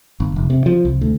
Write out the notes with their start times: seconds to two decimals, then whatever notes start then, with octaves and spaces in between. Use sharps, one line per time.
0.20 G1
0.36 F1
0.50 C3
0.66 F3
0.85 C2
1.01 D2